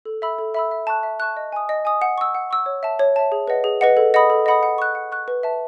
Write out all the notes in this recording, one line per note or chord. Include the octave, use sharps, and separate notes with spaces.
A4
E5 B5 E6
A4
E5 B5 E6
E5
A5 C#6 F#6
E5
A5 C#6 F#6
D#5
G#5 D#6
D#5
G#5 D#6
F#5
C#6 E6
F#5
C#6 E6
C#5
E5 A5
C#5
E5 A5
G#4
B4 D#5 F#5
G#4
B4 D#5 F#5
A4
D#5 F#5 B5 D#6
A4
D#5 F#5 B5 D#6
F#5
C#6 F#6
F#5
C#6 F#6
B4
E5 A5